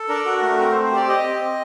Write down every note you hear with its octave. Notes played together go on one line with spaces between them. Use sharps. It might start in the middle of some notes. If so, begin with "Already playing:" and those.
Already playing: A4
D4 A#4
F#4
A3
C4 A#4
C5
C4
C5
G4 D5
G4 D#5
C4
C4